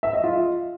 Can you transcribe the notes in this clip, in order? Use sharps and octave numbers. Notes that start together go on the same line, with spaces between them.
E5
D#5
F4